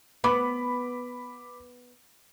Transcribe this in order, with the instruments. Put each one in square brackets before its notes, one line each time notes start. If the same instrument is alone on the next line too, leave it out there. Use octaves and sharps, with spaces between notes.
[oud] B3 [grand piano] B5 D6